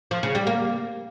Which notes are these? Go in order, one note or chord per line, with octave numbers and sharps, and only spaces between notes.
F3
C#3
G3
A#3